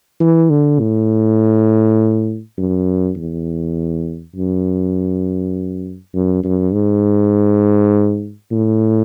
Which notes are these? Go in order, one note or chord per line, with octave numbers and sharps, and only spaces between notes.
E3
D3
A2
F#2
E2
F#2
F#2
F#2
G#2
A2